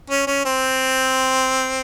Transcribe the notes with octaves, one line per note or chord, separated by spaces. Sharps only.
C#4
C#4
C4